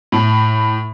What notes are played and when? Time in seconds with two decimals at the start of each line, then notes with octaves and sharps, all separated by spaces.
0.12 A2